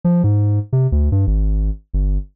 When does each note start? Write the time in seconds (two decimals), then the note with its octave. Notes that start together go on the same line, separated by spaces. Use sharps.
0.04 F3
0.24 G#2
0.73 C3
0.92 D2
1.12 G2
1.27 G#1
1.94 G1